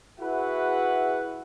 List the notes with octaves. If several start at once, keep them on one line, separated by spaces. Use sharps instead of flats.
E4 F#4 G#4 B4 E5 F#5